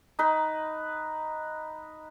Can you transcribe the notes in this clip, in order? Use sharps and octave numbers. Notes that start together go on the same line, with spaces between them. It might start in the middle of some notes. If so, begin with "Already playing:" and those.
D#4 B4